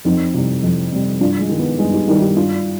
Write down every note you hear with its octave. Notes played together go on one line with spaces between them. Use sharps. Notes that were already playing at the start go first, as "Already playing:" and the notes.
F2 C4 D#4
C3 G3
F2
C3 G3
G2 D4 F4
G#3
D#3 G3
B3
G2 G#3
D#4 G4
D#3 G3 D#4 G4
D#4 G4
G2 D4 F4